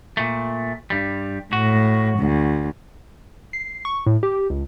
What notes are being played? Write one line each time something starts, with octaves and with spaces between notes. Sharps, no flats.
A#2 A3
G2 G3
A2 F#4
D2
C7
C#6
A2
G4
C#2